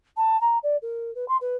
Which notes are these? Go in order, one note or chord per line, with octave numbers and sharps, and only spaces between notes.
A5
A#5
D5
A#4
B4
C6
B4